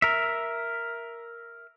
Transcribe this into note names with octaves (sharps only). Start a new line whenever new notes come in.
A#4 E5